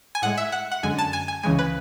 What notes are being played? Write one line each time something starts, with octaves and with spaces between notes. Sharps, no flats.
G#5
A2 G#3 F#5
E5
F#5
F#5
F#2 D3 G#3 G#5
A5
G#5
G#5
C#2 C#3 E3 G#3 G#5
B4